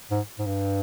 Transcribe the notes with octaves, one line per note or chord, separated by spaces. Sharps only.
G#2
G#2
G2